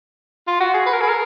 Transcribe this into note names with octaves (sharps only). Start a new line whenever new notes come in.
F4
F#4
G#4
B4
A#4
G#4
A#4